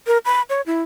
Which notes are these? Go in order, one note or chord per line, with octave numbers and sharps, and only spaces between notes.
A#4
B5
C#5
E4